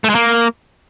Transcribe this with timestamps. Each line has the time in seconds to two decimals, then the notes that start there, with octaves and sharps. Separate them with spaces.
0.04 A3
0.10 G#3
0.15 A#3